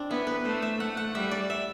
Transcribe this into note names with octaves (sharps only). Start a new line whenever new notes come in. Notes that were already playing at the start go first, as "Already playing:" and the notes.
Already playing: C4 D4
B3 E4
B4
A3 C5
E5
A3 F#5
F#5
G3 E5
D5
E5